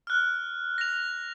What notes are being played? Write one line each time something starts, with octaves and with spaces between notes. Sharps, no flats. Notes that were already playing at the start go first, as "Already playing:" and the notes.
F6 F#6
A#6 F7